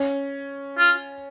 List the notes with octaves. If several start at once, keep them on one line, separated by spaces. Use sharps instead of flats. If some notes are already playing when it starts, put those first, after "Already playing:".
Already playing: C#4
F4